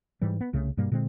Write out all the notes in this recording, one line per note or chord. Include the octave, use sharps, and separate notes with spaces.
G#2 E3 G3
B3
C2 C#3 A3
G2 B2 G3 A#3
A#2 D3 G#3 C4